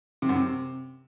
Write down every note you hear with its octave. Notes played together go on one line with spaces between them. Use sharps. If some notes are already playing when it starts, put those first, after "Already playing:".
C3
F#2
C3